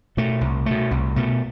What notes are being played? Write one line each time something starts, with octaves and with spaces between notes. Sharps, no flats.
B2 A3
C2
B2 A3
C2
B2 A3